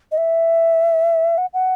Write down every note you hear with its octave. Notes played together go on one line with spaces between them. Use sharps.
D#5
E5
F#5
F#5